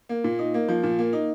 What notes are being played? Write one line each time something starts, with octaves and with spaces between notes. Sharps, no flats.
A#3
A#2
D#4
A#3
F3
A#2
A#3
D#4